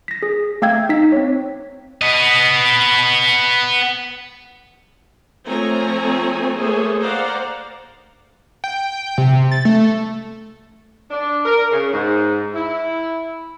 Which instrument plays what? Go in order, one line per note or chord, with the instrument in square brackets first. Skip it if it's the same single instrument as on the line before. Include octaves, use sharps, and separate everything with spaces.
[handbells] A#6 B6
G#4
A3 F5 G5 E6 G#6
D#4 B6
C4 C#5
[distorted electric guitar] B3 D#5
[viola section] F3 A3 C4 C#5 G#5 A#5
A3 A#3 G#4 C5 C#5
C5 D5 F5 F#5 A#5
[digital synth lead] G5
C3
A6
A3
[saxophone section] D4
A#4
C#3
G#2
E4